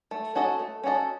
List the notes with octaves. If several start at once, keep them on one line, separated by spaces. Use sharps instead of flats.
A3
C#4 F#4 A4 D#5
A3
C#4 F#4 A4 D#5